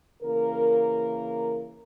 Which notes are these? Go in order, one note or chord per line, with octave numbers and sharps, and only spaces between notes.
C#3 E3 A#3 A#4